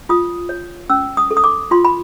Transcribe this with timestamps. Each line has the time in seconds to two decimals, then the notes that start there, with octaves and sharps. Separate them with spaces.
0.09 F4 D#6
0.49 C#5
0.90 C#4 E6
1.17 D#6
1.31 A4
1.37 D#6
1.44 D6
1.71 F4 C6
1.85 B5